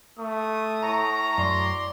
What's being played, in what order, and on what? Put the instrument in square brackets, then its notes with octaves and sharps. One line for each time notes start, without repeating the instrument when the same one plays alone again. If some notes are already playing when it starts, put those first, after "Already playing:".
[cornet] A3 [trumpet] D#6
[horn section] A2 C#5 A#5
[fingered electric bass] F#2 [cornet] D5 [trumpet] C6